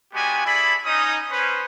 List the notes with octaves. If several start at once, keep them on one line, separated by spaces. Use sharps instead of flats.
G#3 B3 D4 F#4 G4 G#5
E4 G#4 A4 D5 B5
C#4 D#4 D#6
C#4 B4 C5